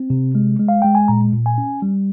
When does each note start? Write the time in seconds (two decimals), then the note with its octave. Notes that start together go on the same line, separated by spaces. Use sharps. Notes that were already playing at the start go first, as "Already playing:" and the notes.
Already playing: C4
0.10 C3
0.35 G#3
0.60 G#3
0.68 F5
0.82 G#3 G5
0.95 G#5
1.08 A#2 A#5
1.33 A#2
1.46 G#5
1.58 C#4
1.82 G3